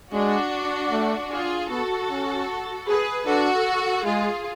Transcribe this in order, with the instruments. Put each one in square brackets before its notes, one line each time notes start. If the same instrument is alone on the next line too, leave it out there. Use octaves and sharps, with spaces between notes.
[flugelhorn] G#3 [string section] D4 F#4
[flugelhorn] A3
[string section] F4 G#4
[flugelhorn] B3 [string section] F#4 A4
[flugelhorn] C#4
[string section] G#4 B4
[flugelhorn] D4 [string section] F#4 A4
[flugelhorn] G#3 [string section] F4 G#4